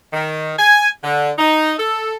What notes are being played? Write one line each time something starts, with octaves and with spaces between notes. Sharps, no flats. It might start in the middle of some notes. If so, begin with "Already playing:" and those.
D#3
G#5
D3
D#4
A4